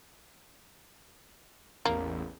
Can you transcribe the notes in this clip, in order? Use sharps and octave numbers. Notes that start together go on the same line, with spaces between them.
A1 E2 A#3